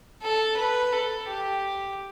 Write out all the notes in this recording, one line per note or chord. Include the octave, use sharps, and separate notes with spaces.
A4
B4
A4
G4